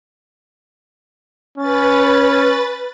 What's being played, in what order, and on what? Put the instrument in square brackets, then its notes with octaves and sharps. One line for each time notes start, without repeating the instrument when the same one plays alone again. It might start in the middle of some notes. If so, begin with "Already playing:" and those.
[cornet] C#4 [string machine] B4 A6